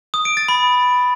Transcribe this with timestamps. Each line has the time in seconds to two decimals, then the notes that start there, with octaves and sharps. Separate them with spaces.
0.14 D#6
0.25 D7
0.37 A6
0.48 B5